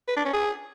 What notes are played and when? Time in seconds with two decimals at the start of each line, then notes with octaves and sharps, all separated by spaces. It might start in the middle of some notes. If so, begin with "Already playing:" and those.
0.08 B4
0.17 D4
0.25 C#4
0.34 G#4